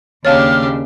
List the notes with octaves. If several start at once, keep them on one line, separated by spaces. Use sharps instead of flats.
D#2 C#3 D4 G4 C#5 F5 A5 F6